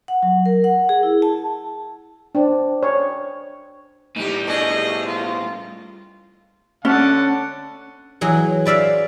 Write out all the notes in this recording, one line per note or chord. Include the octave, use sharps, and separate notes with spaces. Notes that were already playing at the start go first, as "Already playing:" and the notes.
F#5
F#3
A#4
F#5
G#4
E4
A5
D4 C5 D5 G5
C#5
A2 G3 D#4 G4
A3 D4 G#4 D#5
F4
D3 C#4 F#5 A5
E3 F#3 G#4
B4 D5 E5 F5